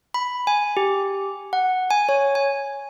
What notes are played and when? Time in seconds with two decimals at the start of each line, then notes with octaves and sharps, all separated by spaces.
0.14 B5
0.47 G#5
0.77 G4
1.53 F#5
1.90 G#5
2.09 C#5
2.35 G#5